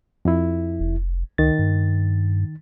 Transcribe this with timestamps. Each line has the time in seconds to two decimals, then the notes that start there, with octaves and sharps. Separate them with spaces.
0.25 F2 E4
0.80 F1
1.38 C#2 D#3 A6
1.59 G2